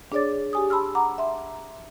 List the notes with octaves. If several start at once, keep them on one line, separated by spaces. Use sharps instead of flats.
D4 G#4 C#5 D5 D6 A6
G4 G#5 D#6
A5 B5 C6 E6 F6
F#5 A#5 D6
E5 C6